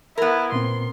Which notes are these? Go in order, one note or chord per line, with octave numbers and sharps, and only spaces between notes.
B3 E4 A#4
A#2 C4 C6